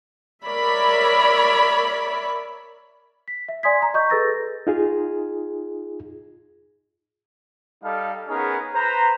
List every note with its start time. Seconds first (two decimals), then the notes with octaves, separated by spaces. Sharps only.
0.45 A#4 C#5 D5 E5 B5
3.28 B6
3.49 E5
3.63 D5 G#5 C6 D#6 G#6 B6
3.82 A#5
3.94 D#5 C#6 D#6 G6
4.10 G#4 A4 B4 E6 A6 A#6
4.67 D#4 F4 G#4
7.84 G3 D#4 A4 F5
8.29 B3 C#4 D#4 G#4 A#4
8.75 B4 C5 A#5